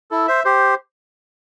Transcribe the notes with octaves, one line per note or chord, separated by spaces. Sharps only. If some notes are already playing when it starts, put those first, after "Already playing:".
E4 A4
C5 E5
G4 C5